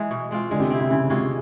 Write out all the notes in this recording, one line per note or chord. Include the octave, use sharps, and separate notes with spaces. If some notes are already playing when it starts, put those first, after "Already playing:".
Already playing: E3 G#3
B2
G#3 C4 F4
D3 G#3
C3
C4 E4
C3
C#3 E3
C3 G#3 C#4 F4